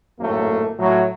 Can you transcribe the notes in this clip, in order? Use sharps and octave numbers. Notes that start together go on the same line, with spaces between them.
G#1 F#2 A2 A3 A#3
A2 F#3